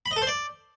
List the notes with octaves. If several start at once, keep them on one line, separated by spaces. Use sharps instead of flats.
B5
D#5
A4
C5
D5